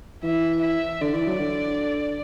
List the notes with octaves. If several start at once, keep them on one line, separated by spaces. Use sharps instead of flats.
E3 E5
E5
D3 D5
E3
F#3
D3